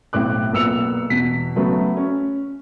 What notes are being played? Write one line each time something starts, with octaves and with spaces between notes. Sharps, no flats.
B1 A2 C4 D6 F#6
B1 A#2 B3 E6 C#7 F7
E2 B2 B6
C#3 F#3 A3 B3
C#4